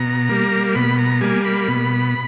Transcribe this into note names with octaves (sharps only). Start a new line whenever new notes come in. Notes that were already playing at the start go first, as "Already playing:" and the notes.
Already playing: B2 A#5
G3 A#3
B2 B5
A#5
G3 A#3 G#5
B5
B2